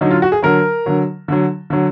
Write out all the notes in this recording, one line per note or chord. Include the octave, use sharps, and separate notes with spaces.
D3 F#3 D#4
F4
F#4
G#4
D3 F#3 A#4
D3 F#3
D3 F#3
D3 F#3